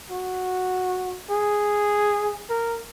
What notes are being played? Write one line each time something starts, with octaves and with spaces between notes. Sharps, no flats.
F#4
G#4
A#4